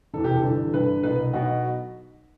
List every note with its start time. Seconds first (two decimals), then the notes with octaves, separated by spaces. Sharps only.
0.14 E1 E2 C3 E3 A4
0.24 G4
0.35 A4
0.44 G1 G2 E3
0.73 G1 G2 D3 B4
1.03 C2 B2 B4
1.33 B1 B2 F#4